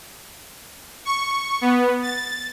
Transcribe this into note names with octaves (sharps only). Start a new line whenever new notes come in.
C#6
B3
A6